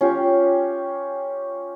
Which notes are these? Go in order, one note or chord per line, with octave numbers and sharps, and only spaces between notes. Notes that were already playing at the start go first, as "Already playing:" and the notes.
C#4 F4 G4